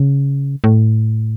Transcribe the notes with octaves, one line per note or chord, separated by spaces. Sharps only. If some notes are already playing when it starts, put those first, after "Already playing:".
Already playing: C#3
A2